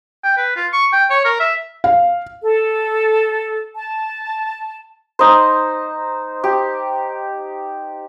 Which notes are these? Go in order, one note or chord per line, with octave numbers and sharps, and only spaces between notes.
G5
B4
F4
C#6
G5
C#5
A#4
E5
F5
A4
A5
D#4 C5
G4